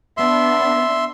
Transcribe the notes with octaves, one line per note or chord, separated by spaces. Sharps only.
B3 D4 E5 C6